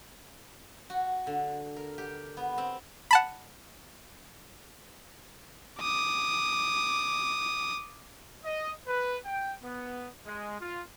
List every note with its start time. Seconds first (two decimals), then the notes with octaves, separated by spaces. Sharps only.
0.90 F#4
1.27 D3
1.76 A#4
1.98 G4
2.37 B3
2.58 C4
3.11 F#5 A5 B5
5.80 D6 D#6
8.45 D#5
8.87 B4
9.25 G5
9.64 B3
10.26 G#3
10.61 F4